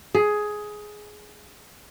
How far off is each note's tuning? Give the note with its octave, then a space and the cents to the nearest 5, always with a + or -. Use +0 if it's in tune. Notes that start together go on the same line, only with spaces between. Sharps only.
G#4 +10